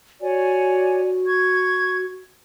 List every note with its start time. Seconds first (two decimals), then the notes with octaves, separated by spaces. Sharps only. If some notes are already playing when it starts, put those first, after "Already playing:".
0.21 F#4 C#5 D5 G#5
1.26 C#6 G#6